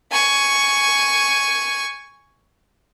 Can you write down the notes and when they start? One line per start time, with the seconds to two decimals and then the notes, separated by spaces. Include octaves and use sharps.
0.11 G#5 C#6